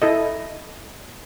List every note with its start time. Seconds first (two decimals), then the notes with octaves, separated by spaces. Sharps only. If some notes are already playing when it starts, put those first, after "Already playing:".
0.02 E4 A4 D#5